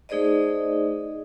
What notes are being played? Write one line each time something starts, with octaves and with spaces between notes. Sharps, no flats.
A3 D#4 G#4 C5 D5 D#5